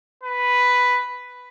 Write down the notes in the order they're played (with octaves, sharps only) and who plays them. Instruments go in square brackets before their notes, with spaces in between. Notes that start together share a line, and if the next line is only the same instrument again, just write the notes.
[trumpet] B4